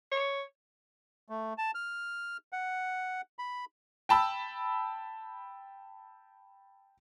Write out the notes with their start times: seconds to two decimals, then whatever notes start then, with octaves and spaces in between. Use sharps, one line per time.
0.12 C#5
1.29 A3
1.58 A5
1.75 F6
2.53 F#5
3.39 B5
4.09 G5 A5 B5 E6